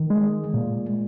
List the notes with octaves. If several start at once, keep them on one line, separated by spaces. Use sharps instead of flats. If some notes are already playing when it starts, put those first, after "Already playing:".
Already playing: D#3
G#3
A#2